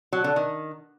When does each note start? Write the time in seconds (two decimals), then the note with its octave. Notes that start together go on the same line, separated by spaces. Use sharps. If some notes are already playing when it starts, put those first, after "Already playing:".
0.13 F#3
0.24 D3
0.36 D#3